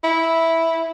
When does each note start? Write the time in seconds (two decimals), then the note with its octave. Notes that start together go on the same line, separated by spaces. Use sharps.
0.04 E4